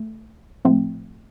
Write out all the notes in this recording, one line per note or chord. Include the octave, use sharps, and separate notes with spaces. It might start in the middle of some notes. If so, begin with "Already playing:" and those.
Already playing: A3
A2 F3 A3 C4